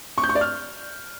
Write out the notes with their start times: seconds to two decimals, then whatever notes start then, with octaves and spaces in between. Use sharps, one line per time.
0.18 C#6
0.23 G6
0.29 C#6
0.35 D5
0.41 F6